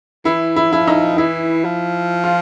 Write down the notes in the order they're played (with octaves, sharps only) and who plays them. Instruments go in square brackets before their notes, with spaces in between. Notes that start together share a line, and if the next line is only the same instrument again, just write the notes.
[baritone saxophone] E3 [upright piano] E4
[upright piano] E4
[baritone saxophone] F3 [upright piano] E4
[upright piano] D#4
[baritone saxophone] E3 [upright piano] E4
[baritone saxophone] F3
[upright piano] F4